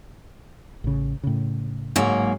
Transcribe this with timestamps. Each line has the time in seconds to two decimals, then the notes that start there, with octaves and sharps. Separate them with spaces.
0.84 A1 C#3
1.23 A2 C#3
1.96 G#2 F#3 A#3